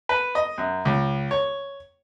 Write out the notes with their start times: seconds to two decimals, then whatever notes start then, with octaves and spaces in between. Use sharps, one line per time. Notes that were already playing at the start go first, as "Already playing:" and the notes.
0.09 B4
0.35 D#5
0.58 F#2
0.85 C#2
1.31 C#5